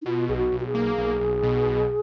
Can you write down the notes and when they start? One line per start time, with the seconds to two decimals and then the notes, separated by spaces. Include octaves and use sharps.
0.02 D#4
0.06 B2 F4
0.29 B1 G#4
0.37 F#4
0.52 B1
0.60 F#4
0.67 G#4
0.75 A#3
0.98 B1
1.21 B1
1.43 B2
1.66 B1